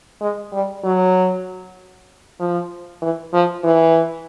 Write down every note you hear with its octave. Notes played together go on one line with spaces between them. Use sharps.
G#3
G3
F#3
F3
E3
F3
E3